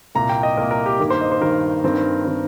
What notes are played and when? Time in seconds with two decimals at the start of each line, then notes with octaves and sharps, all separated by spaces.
0.15 C2 A#2 A#3 A#5
0.29 G5
0.43 D#5
0.57 C2 A#2 A#3 A#4
0.71 A#4
0.86 G4
1.00 G2 D#3 A#3
1.10 C5
1.21 D#5
1.32 C5
1.41 G2 D#3 A#3 A#4
1.84 G2 D#3 C4
2.25 D#3 C4